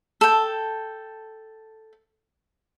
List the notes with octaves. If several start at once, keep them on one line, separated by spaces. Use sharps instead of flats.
A4 G5